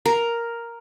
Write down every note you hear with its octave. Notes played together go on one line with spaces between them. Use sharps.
A#4